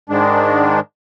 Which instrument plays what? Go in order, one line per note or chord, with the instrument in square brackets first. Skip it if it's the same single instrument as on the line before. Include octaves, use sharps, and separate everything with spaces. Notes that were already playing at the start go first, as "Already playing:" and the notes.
[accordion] G#2 D#3 G#3 D4